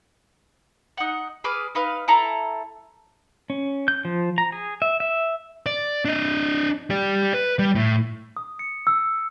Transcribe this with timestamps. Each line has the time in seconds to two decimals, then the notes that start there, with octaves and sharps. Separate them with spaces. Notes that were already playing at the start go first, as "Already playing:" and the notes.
0.97 D#4 F#5
1.44 G#4 B4 D6 F6
1.75 D#4 B4 F5
2.08 E4 A4 A#5
3.50 C#4
3.88 G6
4.05 F3
4.38 A#5
4.52 G#4
4.82 E5
5.00 E5
5.66 D5
6.05 D4 D#5
6.90 G4 D5
7.34 B4
7.59 G3
7.75 A2
8.37 D#6
8.59 C#7
8.87 E6